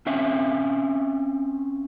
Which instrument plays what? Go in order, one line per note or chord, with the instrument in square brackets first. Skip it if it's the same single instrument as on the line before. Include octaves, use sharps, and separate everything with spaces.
[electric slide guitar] C4 C#4 E5 F5